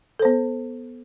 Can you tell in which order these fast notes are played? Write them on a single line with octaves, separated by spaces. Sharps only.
A4 C5 B3